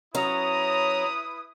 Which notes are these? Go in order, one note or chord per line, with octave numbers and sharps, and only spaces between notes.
F#3 C#4 E4 B4 A#5 D#6